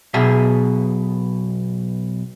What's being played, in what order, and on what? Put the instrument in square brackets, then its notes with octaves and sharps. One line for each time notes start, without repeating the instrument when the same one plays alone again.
[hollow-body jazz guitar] B1 B2 G#4 E5